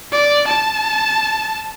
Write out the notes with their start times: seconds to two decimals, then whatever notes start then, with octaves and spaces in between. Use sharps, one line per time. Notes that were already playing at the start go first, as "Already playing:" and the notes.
0.13 D5
0.47 A5